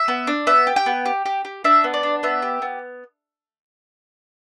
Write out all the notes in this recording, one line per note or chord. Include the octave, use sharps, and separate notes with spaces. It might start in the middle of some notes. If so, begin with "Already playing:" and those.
Already playing: E5
B3
D4
B3 E5
G4
G5
B3
G4
G4
G4
D4 E5
B3
D5
D4
B3 E5
G4
B3